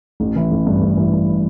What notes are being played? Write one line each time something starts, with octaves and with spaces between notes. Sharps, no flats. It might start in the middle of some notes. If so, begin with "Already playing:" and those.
A1
E3
A1
G2
A1
E3
G2